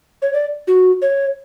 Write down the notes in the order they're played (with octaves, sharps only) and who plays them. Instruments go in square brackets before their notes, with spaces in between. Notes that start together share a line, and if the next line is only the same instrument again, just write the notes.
[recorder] C#5
D5
F#4
C#5